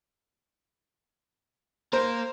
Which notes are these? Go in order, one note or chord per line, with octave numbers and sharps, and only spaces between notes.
A#3 A#4 C5